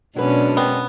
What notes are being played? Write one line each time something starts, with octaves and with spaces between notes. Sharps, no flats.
F#2 B2 F#3 G#3 C#4 D4 B4
B3 C4